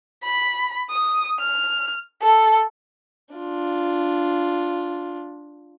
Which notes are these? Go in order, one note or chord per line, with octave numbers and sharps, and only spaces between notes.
B5
D#6
F6
A4
D4 F4